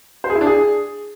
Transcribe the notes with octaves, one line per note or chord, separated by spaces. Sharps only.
C5
G#4
E4
D4
G#4